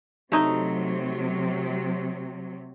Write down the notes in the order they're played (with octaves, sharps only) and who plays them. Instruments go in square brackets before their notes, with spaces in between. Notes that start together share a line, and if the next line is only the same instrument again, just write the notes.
[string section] C3 F#3 [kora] A3 D#4